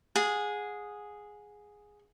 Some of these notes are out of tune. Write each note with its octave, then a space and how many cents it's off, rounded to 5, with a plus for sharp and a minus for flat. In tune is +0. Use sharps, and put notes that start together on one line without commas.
G#4 +0 F#5 -30